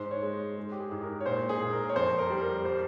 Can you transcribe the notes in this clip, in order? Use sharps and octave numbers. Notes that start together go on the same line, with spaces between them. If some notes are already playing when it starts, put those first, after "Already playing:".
Already playing: G#2 C5
C#5
G#3
G#3
G4
G#4
G#2
A#4
C#5
A#2 C5
G#4
A#2
A#4
C#5
F2 C5
A#4
G3
A#4
G3 C5